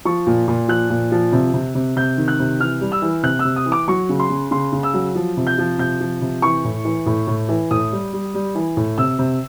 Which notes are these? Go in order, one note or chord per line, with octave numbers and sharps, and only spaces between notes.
F3 C#6
A#2
A#2
F3 F#6
A#2
F3
C3
C3
C3
C3 G6
D#3
F#6
C3
E3 F6
G3
E6
E3
C3 F#6
E6
C3
D#6
E3
D6
F#3 C#6
C#3
C6
C#3
C#3 C6
C#3
E6
F#3
F3
C3
G6
F3
C3 G6
F3
C3
E3 C#6
A2
E3
A2
A2
E3
A2 D#6
G3
G3
G3
E3
A2
C3 E6
C3